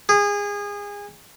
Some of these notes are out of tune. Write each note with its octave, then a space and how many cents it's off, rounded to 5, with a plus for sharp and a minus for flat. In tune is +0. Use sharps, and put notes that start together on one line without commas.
G#4 -25